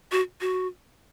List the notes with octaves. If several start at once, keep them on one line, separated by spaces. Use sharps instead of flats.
F#4
F#4